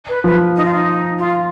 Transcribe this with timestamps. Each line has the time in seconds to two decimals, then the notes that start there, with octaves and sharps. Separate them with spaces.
0.08 B4
0.24 F3 B4
0.56 D#4
0.65 F4
0.74 D#4
1.18 F4